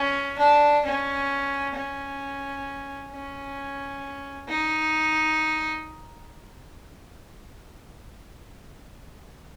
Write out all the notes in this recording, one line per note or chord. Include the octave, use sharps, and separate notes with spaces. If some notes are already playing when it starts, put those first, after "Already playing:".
Already playing: C#4
D4
C#4
C#4
C#4
D#4